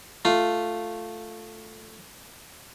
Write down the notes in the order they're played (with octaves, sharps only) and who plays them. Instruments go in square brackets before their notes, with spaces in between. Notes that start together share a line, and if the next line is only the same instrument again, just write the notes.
[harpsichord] A3 F4